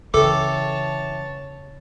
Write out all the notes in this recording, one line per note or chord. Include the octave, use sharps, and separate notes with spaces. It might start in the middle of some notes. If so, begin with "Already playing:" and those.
C#3 E3 G4 A4 C#5 A5 D6